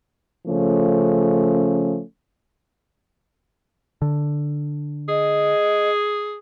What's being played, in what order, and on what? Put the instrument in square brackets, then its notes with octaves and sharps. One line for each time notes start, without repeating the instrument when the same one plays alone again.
[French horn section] C#3 F3 A3 C#4
[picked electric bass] D3
[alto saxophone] G#4 [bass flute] D#5